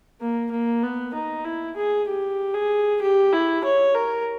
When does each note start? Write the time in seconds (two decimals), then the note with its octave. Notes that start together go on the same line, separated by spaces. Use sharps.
0.20 A#3
0.51 A#3
0.83 B3
1.14 D#4
1.44 E4
1.77 G#4
2.08 G4
2.54 G#4
3.01 G4
3.33 E4
3.64 C#5
3.95 A#4